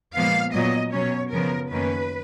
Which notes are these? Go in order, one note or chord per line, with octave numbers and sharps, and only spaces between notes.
A#2 F3 G#3 B3 F5
A#2 F#3 B3 D#5
B2 F#3 C#4 C#5
F#2 C#3 F3 B3 A#4
F#2 D#3 A#3 C#4 B4